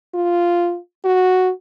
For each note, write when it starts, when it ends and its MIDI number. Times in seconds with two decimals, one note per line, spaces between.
0.14 0.78 65
1.05 1.51 66